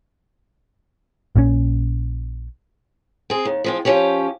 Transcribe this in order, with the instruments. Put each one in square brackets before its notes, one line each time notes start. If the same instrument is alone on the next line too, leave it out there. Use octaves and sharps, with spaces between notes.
[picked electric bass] A#1 A#2 F3 C#4
[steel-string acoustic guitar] C4 G#4
D#2
F3 G#3 C4
F3 C#4 G4 C#5